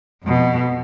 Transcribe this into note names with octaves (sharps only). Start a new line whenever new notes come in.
F2 B2